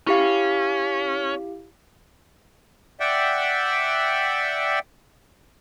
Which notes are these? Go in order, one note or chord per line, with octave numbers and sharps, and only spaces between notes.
C#4 E4 G4 F5
D5 E5 F#5 G5